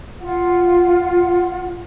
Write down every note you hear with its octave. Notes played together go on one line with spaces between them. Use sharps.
F4 F#5